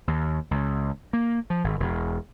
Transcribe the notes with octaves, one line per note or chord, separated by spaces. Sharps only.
D#2
C#2
A#3
F3
G#1
E1